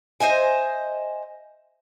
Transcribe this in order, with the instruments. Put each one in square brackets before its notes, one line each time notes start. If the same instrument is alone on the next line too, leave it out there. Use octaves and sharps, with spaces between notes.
[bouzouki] C5 D#5 E5 G#5